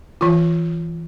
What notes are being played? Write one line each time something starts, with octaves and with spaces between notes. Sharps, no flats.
E3 F4